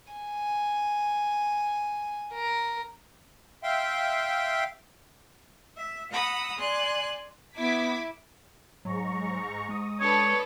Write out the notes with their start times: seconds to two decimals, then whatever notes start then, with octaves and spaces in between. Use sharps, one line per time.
0.13 G#5
2.34 A#4
3.63 E5 F5 G5 C6
5.77 E5
6.10 F#5 A#5 B5 D#6 E6
6.57 D5 G#5 C6 F#6
7.58 B3 E4 D6 G#6 B6
8.85 G#2 F#3 A#5 C#6
9.69 G#3 D#6
10.00 D4 A4 B4 C#5